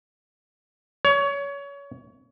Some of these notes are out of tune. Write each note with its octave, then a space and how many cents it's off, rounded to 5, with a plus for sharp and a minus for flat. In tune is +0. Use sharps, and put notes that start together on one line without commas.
C#5 +25